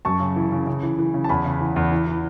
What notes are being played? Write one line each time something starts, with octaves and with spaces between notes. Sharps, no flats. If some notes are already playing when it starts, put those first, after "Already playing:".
F#2 A5 C#6
C#3
E3
C#3
C#3
E3
E3
C#3
A5
E2 G#5 B5
C#3
E3
E2
E3
E3